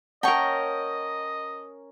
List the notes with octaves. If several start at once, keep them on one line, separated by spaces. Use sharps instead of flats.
C#4 A#4 D#5 F#5 G5 A5 C#6